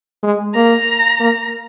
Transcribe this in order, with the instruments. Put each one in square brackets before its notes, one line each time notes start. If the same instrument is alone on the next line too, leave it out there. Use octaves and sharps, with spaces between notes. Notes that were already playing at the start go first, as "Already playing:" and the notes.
[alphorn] G#3
[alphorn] A#3 [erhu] A#5
[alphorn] A#3